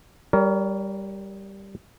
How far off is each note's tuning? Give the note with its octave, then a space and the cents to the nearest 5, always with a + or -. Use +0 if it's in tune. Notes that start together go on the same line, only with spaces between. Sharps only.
G3 +0 A#4 +0 C#5 +40